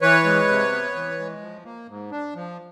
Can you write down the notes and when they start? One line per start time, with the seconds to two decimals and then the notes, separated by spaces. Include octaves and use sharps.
0.01 E3 B4 C#5
0.25 G#3
0.49 C3
0.72 B3
0.95 E3
1.19 G#3
1.41 F3
1.64 A#3
1.88 G#2
2.11 D4
2.35 F3